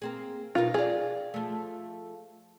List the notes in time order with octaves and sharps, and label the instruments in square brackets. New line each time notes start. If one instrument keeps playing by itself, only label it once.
[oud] A#3 C4 G#4
[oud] B2 D#4 A#4 [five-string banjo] F4
[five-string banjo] F4 G#4 [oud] G4 D5
[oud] F3 A3